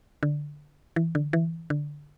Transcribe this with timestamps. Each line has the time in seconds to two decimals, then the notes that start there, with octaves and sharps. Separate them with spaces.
0.23 D3
0.96 E3
1.15 D3
1.33 E3
1.70 D3